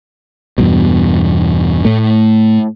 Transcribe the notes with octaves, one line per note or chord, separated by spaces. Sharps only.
E2 G2 B2
A2 A3